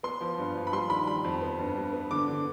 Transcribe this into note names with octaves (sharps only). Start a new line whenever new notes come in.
B3 C6
F3
G2
F3
B5
G3 C6
D#3 B5
G3 B5
F2
B3
G2
G2
B3
D3 D6
D3